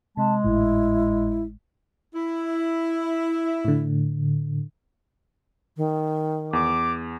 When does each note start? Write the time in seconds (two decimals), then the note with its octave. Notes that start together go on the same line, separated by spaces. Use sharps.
0.17 C3 G#3 A5
0.44 G#1 A2 E4
2.15 E4
3.65 A2 D3
5.77 D#3
6.53 E2 D6